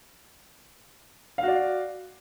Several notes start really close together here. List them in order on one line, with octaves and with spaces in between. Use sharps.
F5 F#4 D5